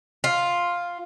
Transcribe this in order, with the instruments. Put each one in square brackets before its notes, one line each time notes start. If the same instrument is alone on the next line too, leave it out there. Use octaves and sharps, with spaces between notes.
[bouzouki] F4